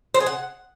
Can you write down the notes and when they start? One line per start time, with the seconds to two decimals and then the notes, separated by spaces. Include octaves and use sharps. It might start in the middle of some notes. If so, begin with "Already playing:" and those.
0.14 C5
0.20 G#4
0.26 F#5